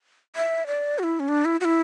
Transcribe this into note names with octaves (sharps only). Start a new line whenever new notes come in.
E5
D5
F#4
E4
C#4
D4
E4
F#4
E4